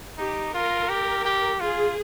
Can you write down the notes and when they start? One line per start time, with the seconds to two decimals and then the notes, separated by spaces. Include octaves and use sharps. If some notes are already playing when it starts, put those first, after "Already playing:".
0.18 D#4 G4
0.53 F4 A#4
0.89 G4
1.25 G4
1.60 F4 G#4